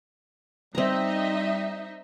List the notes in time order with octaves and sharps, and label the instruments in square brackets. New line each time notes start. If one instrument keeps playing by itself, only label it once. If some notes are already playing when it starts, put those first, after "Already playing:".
[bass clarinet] G3 [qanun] C4 A#5 [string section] D#4 D#5 E5